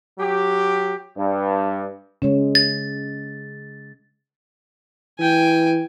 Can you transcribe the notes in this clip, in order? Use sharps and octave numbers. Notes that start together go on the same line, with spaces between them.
F#3 G4
G2
C#3 G#3 C#4 C#5
A6
E3 G5 G#5